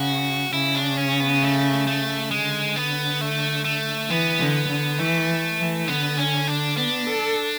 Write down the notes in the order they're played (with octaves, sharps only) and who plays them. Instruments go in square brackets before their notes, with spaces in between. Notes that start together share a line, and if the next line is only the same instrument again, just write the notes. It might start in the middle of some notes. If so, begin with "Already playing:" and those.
Already playing: [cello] C#3 [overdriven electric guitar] F#4
[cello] C#3 [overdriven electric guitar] E4
[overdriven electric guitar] D4
C#4
B3
A3
A3
[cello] D3 [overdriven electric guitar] G#3
[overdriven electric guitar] B3
A3
A3
[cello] E3 [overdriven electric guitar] B3
[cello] D3
D3
[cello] E3 [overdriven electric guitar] A3
[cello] E3
[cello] D3 [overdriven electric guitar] B3
[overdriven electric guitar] C#4
D4
[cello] B3 [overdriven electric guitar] D4
[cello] A4